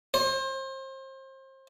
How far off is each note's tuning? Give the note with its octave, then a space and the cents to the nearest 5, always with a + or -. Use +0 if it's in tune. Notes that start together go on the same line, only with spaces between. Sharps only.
C5 +30